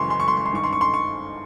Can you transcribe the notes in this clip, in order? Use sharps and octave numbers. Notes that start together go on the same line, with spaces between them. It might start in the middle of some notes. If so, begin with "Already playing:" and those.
Already playing: F#2 C#3 E3 C6 C#6
C6
C#6
C6
C#6
C6
G2 D#3 C#6
C6
C#6
C6
C#6